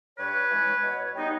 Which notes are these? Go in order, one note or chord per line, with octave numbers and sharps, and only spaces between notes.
G2 B4 C#5
E3 G#3 C#4
B2
G3 B3 D#4